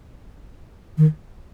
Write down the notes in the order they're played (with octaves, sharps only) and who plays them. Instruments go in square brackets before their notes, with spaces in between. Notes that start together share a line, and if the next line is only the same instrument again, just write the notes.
[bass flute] D#3